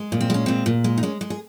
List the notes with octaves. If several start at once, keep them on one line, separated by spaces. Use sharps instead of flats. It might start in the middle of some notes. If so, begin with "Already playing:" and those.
Already playing: G#3
A#2
C4
G#3 C#4
A#2 C4
A#2
G#3
D#4
G#3 C#4
G#3
G#4